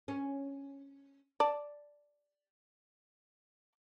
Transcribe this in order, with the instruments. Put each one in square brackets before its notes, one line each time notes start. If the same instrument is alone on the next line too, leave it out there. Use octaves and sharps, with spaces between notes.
[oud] C#4
[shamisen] D5 A5